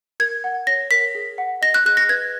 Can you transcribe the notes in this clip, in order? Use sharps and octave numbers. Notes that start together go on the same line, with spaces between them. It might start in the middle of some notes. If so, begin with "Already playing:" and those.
A#4 G#6
F#5
C#5 A#6
A#4 B6
G#4
F#5
D#5 A#6
F#6
G#4 F#6
A#6
B4 G#6